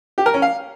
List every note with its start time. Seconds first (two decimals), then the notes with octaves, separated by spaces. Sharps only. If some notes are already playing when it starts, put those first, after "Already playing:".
0.18 G4
0.26 A#4
0.34 C#4
0.42 F5